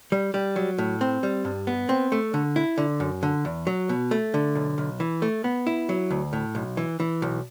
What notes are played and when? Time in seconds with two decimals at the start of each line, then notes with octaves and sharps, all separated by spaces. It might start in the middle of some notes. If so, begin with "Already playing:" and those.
0.12 G3
0.34 G3
0.56 F#3
0.78 A2
1.01 C4
1.23 G3
1.45 G2
1.67 B3
1.89 C4
2.12 A3
2.34 D3
2.56 E4
2.78 D3
3.00 F#2
3.23 D3
3.45 E2
3.67 F#3
3.89 B2
4.11 A3
4.34 D3
4.55 B1
4.78 B1
5.00 E3
5.22 A3
5.44 B3
5.67 E4
5.89 F#3
6.10 D2
6.33 A2
6.55 B1
6.77 E3
7.00 E3
7.22 B1